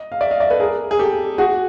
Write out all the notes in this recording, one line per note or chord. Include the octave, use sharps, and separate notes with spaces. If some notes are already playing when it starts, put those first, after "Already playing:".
Already playing: D#5
F5
D5 E5
D#5 F5
D5 E5
A4 B4
G#4 A#4
G#4
G4 A4
F#4 G#4